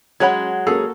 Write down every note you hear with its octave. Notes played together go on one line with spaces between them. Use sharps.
F#3 G#3 C#4 C#5 F#5 B5 G#6
A#3 C#4 F#4 G#4 A4